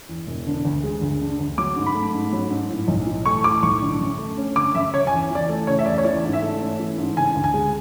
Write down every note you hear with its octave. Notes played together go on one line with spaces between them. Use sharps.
E2
E1
D3
D2
G#3
D2
D3
D2
F#3 D6
G#2
B5
A3
G#2
F#3
G#2
A2
B1
E3
A3 C#6
A2 D6
B1 C#6
D3
F#2
A3
C#4
D3 D6
F#2 E5
C#3 C#5
G#5
E2
E3 D5
A3
C#3 C#5
E5
E2 D5
C#5
E3 D5
G#2
E5
A3
C#4
E3
G#2
C#3 G#5
D2
G#5
G#3